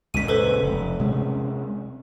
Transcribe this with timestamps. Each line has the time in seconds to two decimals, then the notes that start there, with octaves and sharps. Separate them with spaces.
0.14 C#2 F#2 A#2 B6 D#7
0.28 A4 B4 C5
0.62 F1
0.99 C3 G#3 C#4